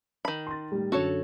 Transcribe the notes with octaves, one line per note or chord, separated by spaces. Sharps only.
D#3 B5
C6 A6
A2 G3
F#2 D3 F#4 A4 C#5